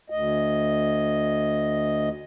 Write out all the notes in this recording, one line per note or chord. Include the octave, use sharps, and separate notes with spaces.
D2 D#5